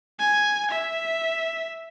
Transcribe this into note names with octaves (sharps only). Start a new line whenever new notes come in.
G#5
E5